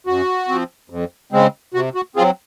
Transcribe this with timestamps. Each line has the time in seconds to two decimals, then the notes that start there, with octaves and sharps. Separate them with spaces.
0.06 F#2 F#4
0.49 F3 C4
0.90 F2
1.32 C#3 G#3 C4
1.74 C3 F#4
1.95 F#4
2.16 C4 F4 G#4
2.20 F#3